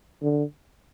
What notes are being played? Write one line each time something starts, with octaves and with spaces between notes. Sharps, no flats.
D3